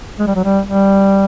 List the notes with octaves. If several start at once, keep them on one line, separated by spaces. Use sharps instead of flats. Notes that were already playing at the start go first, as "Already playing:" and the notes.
G#3
G3
F#3
G3
G3